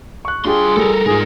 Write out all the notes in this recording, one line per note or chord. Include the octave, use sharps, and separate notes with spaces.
C#6 F#6
G2 D4 F4 G4 G#4 C6
G3 A4 A#4
G#2 F4 G#4 A#4